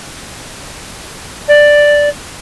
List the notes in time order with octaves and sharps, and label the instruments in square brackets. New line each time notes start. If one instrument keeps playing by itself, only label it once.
[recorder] D5